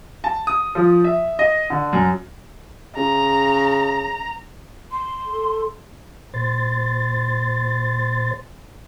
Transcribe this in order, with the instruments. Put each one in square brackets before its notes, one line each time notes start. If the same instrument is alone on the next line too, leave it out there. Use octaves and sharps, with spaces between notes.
[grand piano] A5
D#6
F3
E5
D#5
D3
F#2
[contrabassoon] C#3 [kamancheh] A#5
[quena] C6
[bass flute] A4
[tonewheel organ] A#2 C5 C6 A6